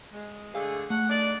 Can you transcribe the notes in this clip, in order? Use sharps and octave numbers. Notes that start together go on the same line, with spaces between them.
G#3
D3 A3 G#4 F5
A3 F#5
D4 D#4 D5